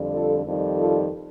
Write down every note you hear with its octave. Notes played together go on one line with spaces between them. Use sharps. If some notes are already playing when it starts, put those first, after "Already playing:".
Already playing: F2 D3 G3
F4 A4
F2 D#3 G3
F4 A4